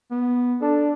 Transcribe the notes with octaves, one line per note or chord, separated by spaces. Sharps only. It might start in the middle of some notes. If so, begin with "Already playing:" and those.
B3
D4 A4